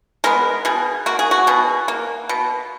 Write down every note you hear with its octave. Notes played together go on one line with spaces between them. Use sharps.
G#3 B3 A#4
B2 G#4
A#3 F#4
G#4
F#4
B2 G#4
A#3
B2